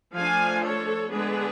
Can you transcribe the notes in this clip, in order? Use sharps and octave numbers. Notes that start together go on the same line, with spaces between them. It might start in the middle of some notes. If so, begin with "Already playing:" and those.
F3 A3 D4 F5 G#5
A4 C#5
D3 G#3 B3 D4 G#4 B4